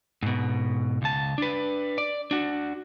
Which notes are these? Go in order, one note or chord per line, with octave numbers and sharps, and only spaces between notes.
G#2 B2
C#2 A5
D4 B4
D5
D4 F#4